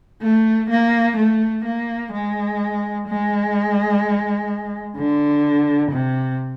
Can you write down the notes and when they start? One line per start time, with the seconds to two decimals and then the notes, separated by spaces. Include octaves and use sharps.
0.22 A3
0.70 A#3
1.17 A3
1.65 A#3
2.12 G#3
3.07 G#3
4.97 D3
5.92 C3